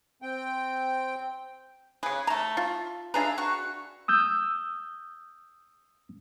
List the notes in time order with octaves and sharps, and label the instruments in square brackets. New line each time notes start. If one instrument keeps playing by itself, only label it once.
[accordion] C4 G5
[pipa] C#3 G#4 [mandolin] B4
[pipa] A3 A#5 [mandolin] A5
[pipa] F4
[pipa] D4 G#4 B4 [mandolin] E5 F5 A#5
[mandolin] F#4 C#6
[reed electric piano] D#6 E6 G6